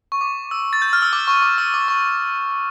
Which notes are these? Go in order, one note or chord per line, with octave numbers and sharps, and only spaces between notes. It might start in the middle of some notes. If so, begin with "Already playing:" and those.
C#6
D6
E6
A6
G6
F6
E6
D6
C#6
D6
E6
D6
C#6